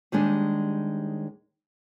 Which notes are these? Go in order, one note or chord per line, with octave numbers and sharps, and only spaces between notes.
D#2 D#3 G3 G#3 D4